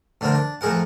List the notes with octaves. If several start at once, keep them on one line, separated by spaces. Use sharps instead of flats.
A2 D3 C4 A#4
D4
F2 A2 G#4 A#4 F#5